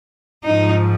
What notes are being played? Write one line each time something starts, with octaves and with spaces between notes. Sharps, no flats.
G#2 F3 D#4